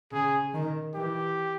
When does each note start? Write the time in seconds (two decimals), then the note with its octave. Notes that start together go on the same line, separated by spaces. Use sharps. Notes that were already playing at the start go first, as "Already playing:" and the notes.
0.12 C#3 G#4
0.53 D#3
0.95 E3 G4